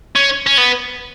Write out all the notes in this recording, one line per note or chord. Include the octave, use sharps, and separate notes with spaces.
C#4
C#4
B3